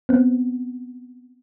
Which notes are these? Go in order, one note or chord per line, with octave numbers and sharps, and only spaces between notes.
B3 C4